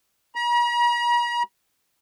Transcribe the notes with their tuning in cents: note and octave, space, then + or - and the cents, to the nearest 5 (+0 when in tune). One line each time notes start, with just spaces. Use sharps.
A#5 +45